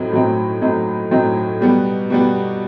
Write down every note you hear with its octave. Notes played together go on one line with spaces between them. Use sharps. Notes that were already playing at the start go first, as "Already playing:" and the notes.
Already playing: A2 F#3 C4 D#4
A2 F#3 C4 D#4
A2 F#3 C4 D#4
A2 F#3 C4 D#4
B2 G3 B3
B2 G3 B3